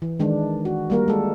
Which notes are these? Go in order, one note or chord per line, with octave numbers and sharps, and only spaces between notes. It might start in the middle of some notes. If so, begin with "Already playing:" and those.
E3
D#3 G#3 D4
F#4
G3 A#3 A#4
G#3 A4